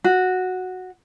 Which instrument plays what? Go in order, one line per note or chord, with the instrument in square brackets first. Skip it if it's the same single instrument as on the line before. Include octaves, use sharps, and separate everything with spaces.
[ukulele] F#4